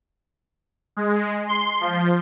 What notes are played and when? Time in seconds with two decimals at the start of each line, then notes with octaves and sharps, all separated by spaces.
0.97 G#3
1.48 C6
1.81 F3